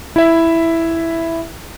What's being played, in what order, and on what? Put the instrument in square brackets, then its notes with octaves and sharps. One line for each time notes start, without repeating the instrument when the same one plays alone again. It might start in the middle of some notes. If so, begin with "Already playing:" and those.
[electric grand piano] E4 E5